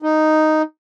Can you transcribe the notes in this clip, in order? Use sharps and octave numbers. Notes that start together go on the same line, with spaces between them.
D#4